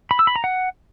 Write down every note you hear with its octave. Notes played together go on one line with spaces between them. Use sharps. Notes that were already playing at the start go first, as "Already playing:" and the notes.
B5
E6
B5
A#5
F#5